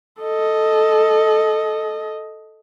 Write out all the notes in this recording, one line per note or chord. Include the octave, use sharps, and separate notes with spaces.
A4 D#5